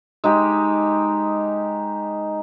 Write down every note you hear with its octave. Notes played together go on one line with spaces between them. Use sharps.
G#3 D#4 G4